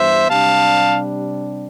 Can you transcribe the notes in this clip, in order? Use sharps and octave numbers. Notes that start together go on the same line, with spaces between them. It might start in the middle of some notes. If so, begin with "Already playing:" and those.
Already playing: G2 E3 B3 C5 E5
C3 G3 D4 F5 A5